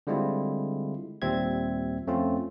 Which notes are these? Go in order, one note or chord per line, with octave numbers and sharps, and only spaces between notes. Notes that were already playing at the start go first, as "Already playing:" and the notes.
D3 G3 G#3 C4 E4 F4
D#2 A#2 G3 C4 E5 G#6
F2 A3 C4 C#4 F4